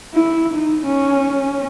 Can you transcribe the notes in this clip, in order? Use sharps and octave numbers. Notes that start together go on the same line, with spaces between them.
E4
D#4
C#4